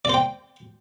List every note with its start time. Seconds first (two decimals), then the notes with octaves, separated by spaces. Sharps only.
0.05 D5
0.09 C5
0.14 G5